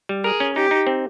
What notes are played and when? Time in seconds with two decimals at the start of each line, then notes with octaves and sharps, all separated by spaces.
0.09 G3
0.24 G#4 A#4
0.40 C#4
0.56 D#4 G4
0.71 D#4
0.87 C4